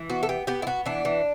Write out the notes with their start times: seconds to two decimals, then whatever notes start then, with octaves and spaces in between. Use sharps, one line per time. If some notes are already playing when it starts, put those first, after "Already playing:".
Already playing: E3
0.10 B3 F#4
0.23 A4
0.29 B3 G4
0.47 B3 G4
0.62 E4
0.67 B3 F#4
0.86 E3 D4
1.05 E3